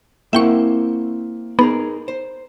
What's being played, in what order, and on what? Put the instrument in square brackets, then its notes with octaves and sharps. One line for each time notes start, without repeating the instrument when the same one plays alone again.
[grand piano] A#3 [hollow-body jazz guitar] C4 E4 F#5 [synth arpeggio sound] E5 G5 C#6
[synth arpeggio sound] B3 [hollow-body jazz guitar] D#4 G#4 A#4
[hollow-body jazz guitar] C5